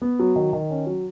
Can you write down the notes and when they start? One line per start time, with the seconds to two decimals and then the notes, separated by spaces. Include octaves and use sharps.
0.02 B3
0.19 F#3
0.36 D#3
0.53 D#3
0.70 C#4
0.87 F#3